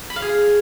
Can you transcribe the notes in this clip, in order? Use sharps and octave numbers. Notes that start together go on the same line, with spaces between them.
B5
F5
G#4